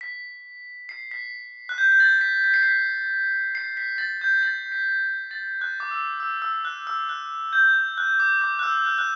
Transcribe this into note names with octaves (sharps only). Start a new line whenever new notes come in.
B6
C7
B6
F#6
G6
G6
A6
B6
B6
C7
B6
C7
B6
A6
G6
A6
B6
A6
F#6
D6
E6
E6
E6
F#6
E6
F#6
G6
F#6
D6
D6
F#6
E6
F#6
F#6